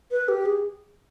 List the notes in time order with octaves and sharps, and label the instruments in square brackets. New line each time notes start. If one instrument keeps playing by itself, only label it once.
[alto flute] B4
G4
G#4